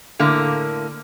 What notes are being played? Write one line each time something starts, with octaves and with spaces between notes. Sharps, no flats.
A2 D3 A#3